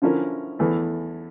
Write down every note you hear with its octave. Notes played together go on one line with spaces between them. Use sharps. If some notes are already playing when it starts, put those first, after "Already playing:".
D3 F3 C#4 E4 A#4
E2 E3 A3